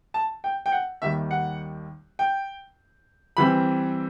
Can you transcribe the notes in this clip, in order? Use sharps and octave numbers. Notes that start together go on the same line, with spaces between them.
A5
G5
G5
F#5
D#2 D#3 G3 E5
F#5
G5
E3 G3 C4 B5